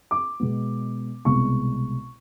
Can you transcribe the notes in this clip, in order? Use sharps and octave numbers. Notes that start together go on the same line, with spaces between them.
D6
B2 G#3 B3
C2 B2 G#3 B3 C#6